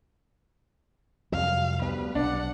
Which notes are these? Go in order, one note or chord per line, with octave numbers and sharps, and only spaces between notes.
C2 F2 F#3 F5
D2 G3 B3 B4
B1 D4 F#5